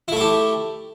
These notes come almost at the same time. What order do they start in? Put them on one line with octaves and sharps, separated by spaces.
E4 A3 A4 G4